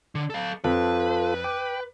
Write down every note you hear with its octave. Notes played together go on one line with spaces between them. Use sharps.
D3
A4 F5
F2 F4 A4 B4
G5 D6